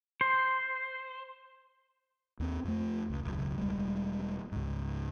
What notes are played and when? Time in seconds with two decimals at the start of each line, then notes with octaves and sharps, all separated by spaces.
0.21 C5
2.40 D#2 C4
2.65 F2 A3
3.10 C#2
3.23 E1 C#2 F#2
3.58 E1 G3 G#3
4.52 C#2 G#2